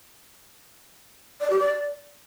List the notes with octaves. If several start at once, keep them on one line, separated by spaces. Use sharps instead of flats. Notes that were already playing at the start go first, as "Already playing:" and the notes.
D5
G4
D5